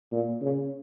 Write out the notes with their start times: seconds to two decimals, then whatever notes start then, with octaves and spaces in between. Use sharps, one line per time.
0.12 A#2
0.41 C#3